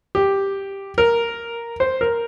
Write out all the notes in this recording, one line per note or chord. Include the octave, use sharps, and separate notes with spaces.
G4
A#4
C5
A#4